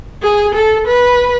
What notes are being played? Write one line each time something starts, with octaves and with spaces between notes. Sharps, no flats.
G#4
A4
B4